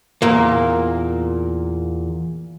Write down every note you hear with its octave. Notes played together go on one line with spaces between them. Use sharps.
E2 A#2 A#3